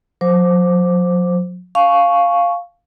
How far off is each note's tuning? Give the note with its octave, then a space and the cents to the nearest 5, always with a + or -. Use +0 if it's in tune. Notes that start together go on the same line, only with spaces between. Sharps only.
F#3 -40 C5 +0 D6 +0
F5 +0 G#5 +45 C#6 +0